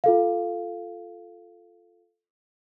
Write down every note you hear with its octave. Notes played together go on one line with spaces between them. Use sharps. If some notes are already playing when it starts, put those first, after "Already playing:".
F4 A4 F5